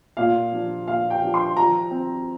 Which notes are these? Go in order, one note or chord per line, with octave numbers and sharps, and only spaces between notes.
A#2 F5
F3 D4
A#2 F5
G5
F3 D4
C6
F3 A#5
C4